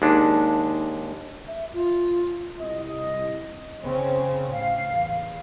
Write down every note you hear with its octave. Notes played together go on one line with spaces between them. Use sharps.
D#2 G#3 D4 D#4 A5
E5
F4
C2 D#5
C#3 C4 C#4
A2 F5
E2